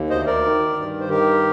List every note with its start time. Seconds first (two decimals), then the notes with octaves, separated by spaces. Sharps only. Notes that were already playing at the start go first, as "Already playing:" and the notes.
Already playing: D#2
0.10 D2 C5 D#5
0.26 A#4 D5
0.43 D#3
0.76 G2
0.99 C5
1.09 D#3 G4 A#4